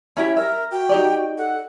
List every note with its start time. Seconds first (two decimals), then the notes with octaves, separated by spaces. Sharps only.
0.17 C#4 E4 G4 E5
0.37 A#4 E5
0.71 F#4 G5
0.89 D#4 G4 D5
1.38 A4 F#5